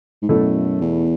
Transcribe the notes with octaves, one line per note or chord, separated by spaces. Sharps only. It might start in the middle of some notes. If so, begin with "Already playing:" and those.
G#2
F#2 B2 A3 E4 A4
E2